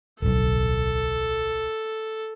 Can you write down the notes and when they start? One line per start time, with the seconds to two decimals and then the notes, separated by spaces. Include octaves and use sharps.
0.22 D1 B1 A4